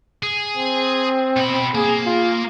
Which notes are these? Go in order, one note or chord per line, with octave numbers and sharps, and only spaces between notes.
G#4
C4
B2 B5
A#3 G#4
F4